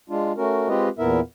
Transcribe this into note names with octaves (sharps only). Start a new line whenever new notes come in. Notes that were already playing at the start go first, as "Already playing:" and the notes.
G#3 D4 F4
A3 C#4 F#4 A#4
G#3 C4 F4 G4 B4 D#5
E2 A#2 B3 E4 A#4 E5